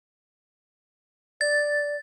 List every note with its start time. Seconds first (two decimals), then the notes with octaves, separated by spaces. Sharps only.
1.41 D5 A6